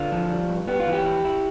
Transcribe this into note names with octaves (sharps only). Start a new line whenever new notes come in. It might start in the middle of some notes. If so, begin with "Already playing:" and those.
Already playing: D3 F4
F3
G3
G2
B3 G4
F4
E3
G4
E4
E4